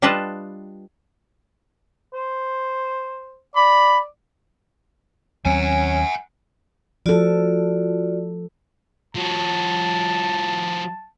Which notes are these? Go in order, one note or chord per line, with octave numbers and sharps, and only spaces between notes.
G3 D4 F4 B4 D#5 A5
C5
D5 B5
D#2 F#3 C4 C#4 F#5 G#5
F3 F4 F#4 A4 D5
F3 F#4 A5